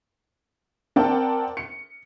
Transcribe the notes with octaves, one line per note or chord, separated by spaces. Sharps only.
C4 A#4 D5 F#5 G5 A5
C#7